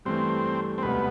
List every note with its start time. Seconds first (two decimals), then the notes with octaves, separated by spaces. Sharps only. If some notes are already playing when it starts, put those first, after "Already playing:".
0.05 G2 E3 A3 C4
0.78 C4
0.83 E1 D2 C3 G3 B3